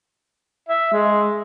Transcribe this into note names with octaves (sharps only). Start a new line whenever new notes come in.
E5
G#3